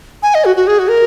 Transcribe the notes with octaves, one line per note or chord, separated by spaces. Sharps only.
G#5
D#5
F#4
F#4
G#4
F#4
A#4